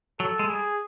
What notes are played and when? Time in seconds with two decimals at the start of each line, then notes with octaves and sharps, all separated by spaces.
0.20 F#3 A4
0.39 G#3
0.49 G3 G#4